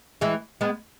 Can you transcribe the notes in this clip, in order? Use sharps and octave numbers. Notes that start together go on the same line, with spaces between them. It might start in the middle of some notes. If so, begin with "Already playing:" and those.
E3 G#3
G#3 B3